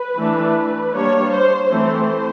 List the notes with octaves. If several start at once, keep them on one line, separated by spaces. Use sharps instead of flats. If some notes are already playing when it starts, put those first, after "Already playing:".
Already playing: B4
E3 A3 D4
G3 A#3 D4 C#5
C5
E3 A3 C4 C5